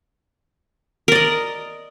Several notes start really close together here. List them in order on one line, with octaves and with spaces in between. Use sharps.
A#4 D5 D#5